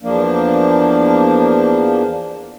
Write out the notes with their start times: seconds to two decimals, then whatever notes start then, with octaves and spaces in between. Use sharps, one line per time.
0.02 E2 F3 A#3 D4